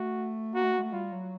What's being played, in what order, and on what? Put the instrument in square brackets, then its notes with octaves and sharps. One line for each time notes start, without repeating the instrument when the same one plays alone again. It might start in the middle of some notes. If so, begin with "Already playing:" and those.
Already playing: [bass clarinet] A3 [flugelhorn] F#4
[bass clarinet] A#3 [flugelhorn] F#4
[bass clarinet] A3
A#3
G#3
A3
[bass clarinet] G3 [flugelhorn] F4
[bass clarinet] F#3